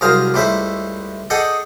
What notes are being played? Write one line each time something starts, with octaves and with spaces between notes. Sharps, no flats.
C2 F#2 G#4 A#4 C5 F5
C#2 G3 A3 E4 C5 E5
G#4 A4 D5 D#5 F#5 G5